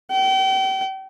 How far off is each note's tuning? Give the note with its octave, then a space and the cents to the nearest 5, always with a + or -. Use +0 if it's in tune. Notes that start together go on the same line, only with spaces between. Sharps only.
G5 -35